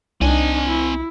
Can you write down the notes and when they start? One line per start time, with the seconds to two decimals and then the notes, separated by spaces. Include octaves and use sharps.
0.21 C2 C4 D4 D#4 G#5
0.67 E4